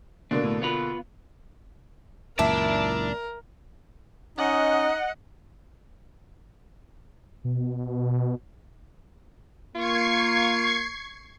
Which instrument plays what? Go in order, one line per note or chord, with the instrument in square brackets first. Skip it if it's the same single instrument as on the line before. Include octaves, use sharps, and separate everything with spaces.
[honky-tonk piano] B2 D3 A#3 [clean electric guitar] D4
[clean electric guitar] A2
B3 F4 B4
[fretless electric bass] C#2 F#2 A#2 [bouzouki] E4 [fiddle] A#4 [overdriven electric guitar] D5 A5
[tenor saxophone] C#4 [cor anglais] D#4 [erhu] D#5 [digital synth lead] F#5
[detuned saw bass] B2
[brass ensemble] A#3 [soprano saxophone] F4 [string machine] C#6 G#6 C7